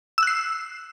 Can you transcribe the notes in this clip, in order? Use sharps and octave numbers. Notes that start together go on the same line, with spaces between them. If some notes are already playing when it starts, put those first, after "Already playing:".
E6 F#6 C7